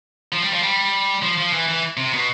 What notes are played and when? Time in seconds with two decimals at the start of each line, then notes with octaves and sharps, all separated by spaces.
0.32 F3
0.42 G3
0.52 F3
0.62 G3
1.23 F3
1.38 F3
1.53 E3
1.68 E3
1.97 C3
2.13 B2